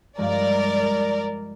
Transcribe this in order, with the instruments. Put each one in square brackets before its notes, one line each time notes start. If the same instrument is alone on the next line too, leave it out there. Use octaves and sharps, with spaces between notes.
[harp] G2 F3 G#3 [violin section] A#4 D5